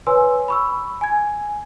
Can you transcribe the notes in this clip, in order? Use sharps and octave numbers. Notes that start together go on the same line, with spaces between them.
B4 C#5 G#5 C6 E6
B5 C#6 E6
G#5 G#6